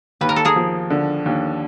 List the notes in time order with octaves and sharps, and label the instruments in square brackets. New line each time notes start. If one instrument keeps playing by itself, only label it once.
[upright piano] D#2 [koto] B4
[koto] A#4
A4
G#4 A#4
[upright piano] F3
D3
D#2